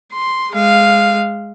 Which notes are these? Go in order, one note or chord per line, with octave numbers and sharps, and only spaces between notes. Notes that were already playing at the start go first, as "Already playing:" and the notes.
C6
G#3 F5